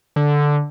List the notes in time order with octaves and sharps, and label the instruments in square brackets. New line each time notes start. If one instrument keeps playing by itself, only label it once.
[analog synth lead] D3